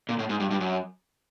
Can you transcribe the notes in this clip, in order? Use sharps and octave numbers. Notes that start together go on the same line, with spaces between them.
A#2
A2
G#2
G2
G2
F#2